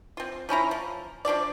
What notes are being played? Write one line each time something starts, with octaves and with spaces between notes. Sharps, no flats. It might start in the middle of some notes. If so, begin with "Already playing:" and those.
C4 F4
F3 C#4 E4 A#5
F3
F3 D4 F#4 D5